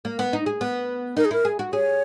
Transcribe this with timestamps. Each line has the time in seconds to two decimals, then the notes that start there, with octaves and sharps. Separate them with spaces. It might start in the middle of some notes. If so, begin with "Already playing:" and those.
0.05 A#3
0.19 B3
0.33 D#4
0.46 G#4
0.61 B3
1.17 D#4 A#4
1.25 G#4
1.31 E4 A#4
1.45 G#4
1.59 F#4
1.73 G#4 C#5